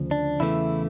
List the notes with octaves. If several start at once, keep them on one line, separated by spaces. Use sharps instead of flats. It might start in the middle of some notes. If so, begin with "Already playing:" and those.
Already playing: D2 C#3 F3
D4
E2 C#3 E3 A3 E4